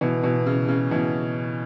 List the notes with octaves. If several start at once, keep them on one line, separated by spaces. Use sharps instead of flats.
B2 E3
B2 E3
C#3
C#3
B2 E3